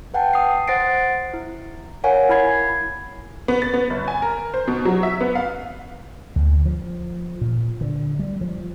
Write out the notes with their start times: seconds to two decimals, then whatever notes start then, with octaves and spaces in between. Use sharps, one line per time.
0.14 B4 F#5 G5 A5
0.34 D#6 C7
0.68 C5 F#5 A6 A#6 C7 D7
1.34 E4
2.04 A#4 C#5 F5 F#5 G#5
2.30 E4 B5 G#6 C7
3.48 B3
3.62 A6
3.74 B3
3.90 G1
4.08 G#5
4.22 A#4
4.54 C5
4.68 B2
4.85 F#3
5.03 E5
5.21 B3
5.36 F5
6.36 D2
6.66 F3
7.41 A#2
7.81 D3
8.19 G3
8.41 F3